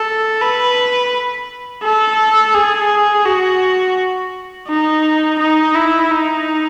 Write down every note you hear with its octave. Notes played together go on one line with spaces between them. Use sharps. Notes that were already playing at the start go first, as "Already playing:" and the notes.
Already playing: A4
B4
A4
G#4
F#4
D#4
D#4
E4
D#4